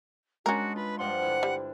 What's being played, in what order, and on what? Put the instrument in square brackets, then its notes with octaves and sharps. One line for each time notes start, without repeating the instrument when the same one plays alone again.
[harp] G#3 D4 [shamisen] C#4 A#4 [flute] F#4
[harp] F4 [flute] B4
[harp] G2 F3 C6 [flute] F#5
[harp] D3 E4
[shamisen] G3